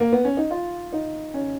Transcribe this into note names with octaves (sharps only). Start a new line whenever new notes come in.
A#3
B3
C#4
D#4
F4
D#4
C#4